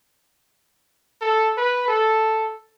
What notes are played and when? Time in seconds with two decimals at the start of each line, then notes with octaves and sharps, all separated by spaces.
1.21 A4
1.57 B4
1.88 A4